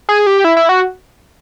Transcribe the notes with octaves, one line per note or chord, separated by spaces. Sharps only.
G#4
G4
E4
E4
F#4